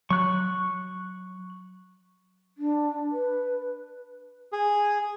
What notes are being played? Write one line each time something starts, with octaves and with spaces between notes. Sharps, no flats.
F#3 C#6 F#6
D4
B4
G#4